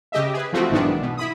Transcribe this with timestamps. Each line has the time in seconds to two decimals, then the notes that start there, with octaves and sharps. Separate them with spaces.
0.12 C#3 G4 D#5 E5
0.34 G#4 B4
0.53 E3 F3 A3 C4 F4 F#4
0.70 B1 G#2 D#3 E3 B3 D4
1.02 B2
1.17 E4 B5 D#6